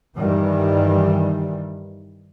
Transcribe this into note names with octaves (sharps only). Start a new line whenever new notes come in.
G2 D#3 E3 G3